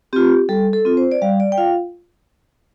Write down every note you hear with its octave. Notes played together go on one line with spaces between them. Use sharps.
C4 F4 G4
G3 A4
A4
C4 F4
C5
D5
G3 F5
D5
G5
F4 F5